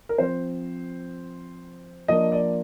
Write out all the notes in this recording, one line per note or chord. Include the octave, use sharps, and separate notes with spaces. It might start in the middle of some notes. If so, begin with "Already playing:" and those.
A#4
F3 C4 C5
F3 A#3 D4 D#5
D5